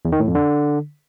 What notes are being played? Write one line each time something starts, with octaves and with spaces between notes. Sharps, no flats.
E2
D#3
A2
F2
D3